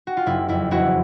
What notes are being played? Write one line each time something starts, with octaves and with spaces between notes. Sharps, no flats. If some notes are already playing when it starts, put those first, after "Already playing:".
F#4
F4
F#1 E4
F2 E4
E1 E4 F#4